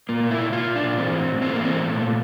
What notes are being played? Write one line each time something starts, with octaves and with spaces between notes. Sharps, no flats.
A#2 A#3
A#2
E4
A#2
A#2 F4
A#2
D4
A#2
E3 C4
A2
A2
E3 C4
E3 A#3
C4
A2 A3
A#2 A3
A#2